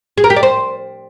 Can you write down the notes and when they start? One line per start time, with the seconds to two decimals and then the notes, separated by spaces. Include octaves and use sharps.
0.18 G#4
0.24 A#4
0.30 G4
0.36 D5
0.43 C5